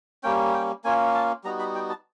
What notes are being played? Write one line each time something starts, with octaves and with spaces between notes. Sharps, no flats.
G3 A#3 C#4 G5
G5
A#3 C#4 F4 G#5
A5
G3 B3 D#4 F#4 A#5
B5
G5
A5